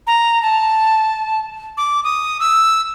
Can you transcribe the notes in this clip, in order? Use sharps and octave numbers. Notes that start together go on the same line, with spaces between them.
A#5
A5
D6
D#6
E6